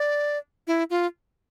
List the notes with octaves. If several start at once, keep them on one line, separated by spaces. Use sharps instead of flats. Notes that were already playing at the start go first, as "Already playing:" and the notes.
Already playing: D5
E4
F4